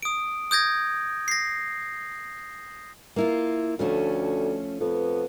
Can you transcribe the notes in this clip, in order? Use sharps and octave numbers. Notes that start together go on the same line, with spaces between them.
D#6 D7
D#6 G6 G#6 A#6
A#6 C7
A#3 E4 F4
D2 F3 A3 C#4
F2 B3